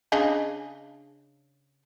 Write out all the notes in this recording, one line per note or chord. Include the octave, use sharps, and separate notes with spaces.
C#3 D4 D#5